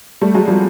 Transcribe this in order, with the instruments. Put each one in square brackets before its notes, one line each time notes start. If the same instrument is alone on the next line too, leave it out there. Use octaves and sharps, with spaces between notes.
[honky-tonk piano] G3 A3
F#3 G#3
F3 G3